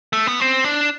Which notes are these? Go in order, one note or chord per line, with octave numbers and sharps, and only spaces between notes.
A3
B3
C4
D4